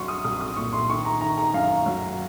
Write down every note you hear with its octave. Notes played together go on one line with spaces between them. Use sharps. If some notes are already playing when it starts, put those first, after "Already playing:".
Already playing: C2 F#3 C6 C#6
D#6
C2 D#6
D#6
A#2 C#6
C6
D#3 C#6
A#5
D#3 A#5
A#5
F#2 F5
F#3